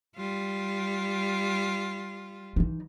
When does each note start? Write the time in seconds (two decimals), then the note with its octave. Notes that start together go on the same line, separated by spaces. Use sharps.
0.16 G3 F4
2.56 E3 D#4